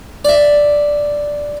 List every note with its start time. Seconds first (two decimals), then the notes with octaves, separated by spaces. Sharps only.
0.25 D5 E5